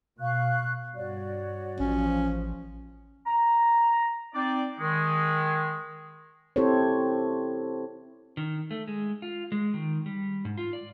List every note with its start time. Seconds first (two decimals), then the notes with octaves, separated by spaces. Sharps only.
0.20 B2 F5 C#6 F#6
0.96 G2 F#4 C#5 D5
1.80 A1 F3 C#4
3.25 A#5
4.34 C4 D#4 D5
4.79 D#3 G#3
6.56 C4 E4 G4 A4 C5 C#5
8.37 D#3
8.71 A3
8.88 G#3
9.22 F4
9.52 G#3
9.74 D#3
10.06 G3
10.45 G#2
10.58 F4
10.73 D5